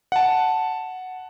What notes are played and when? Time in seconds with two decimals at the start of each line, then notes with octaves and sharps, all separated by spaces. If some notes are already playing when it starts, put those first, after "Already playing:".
0.12 F#5 A5